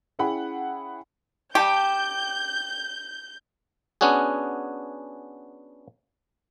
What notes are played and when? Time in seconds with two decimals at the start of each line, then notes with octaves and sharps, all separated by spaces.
0.19 C#4 E4 G#4 F#5 G5 B5
1.55 G4 G5 A5 G6
4.01 B3 C#4 D4 F#4 G#4